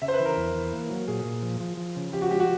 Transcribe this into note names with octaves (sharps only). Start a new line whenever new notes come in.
C#3 E5
C5
B4
E3
A#4
E2
E3
A#3
F#3
A#2 G#4
A#2
F3
F3
F3
C#3
F3 G4
F#4
G#3 G4
F#4